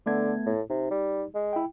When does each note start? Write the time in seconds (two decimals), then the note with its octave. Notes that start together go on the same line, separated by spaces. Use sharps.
0.06 D3 A3 B3 G#6
0.46 A2
0.70 C3 D#4
0.91 G3
1.35 G#3
1.53 E4 G5